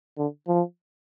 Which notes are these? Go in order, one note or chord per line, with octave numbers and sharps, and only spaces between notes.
D3
F3